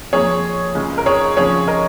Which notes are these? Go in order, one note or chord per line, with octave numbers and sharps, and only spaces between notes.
F2 F3 A#3 G#4 C#5
C#2 C#3 G#3
A#4
G#4 C#5
F2 C#3 F3 G#4 C#5
A#4 D#5